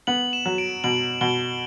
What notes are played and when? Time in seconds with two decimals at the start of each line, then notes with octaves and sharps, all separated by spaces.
0.07 B3 F#7
0.33 E7
0.46 F#3
0.58 D7
0.84 B2 F#7
1.21 B2 G7